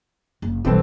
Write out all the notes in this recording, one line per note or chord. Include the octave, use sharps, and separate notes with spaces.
F#1
B1 E3 G3 C4 A4